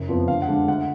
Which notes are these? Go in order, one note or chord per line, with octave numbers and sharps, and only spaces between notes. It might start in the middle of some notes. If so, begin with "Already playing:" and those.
Already playing: F#1
F2 F3 B3
D2 F5
F#5
D3 G#3 D4
D2 F#5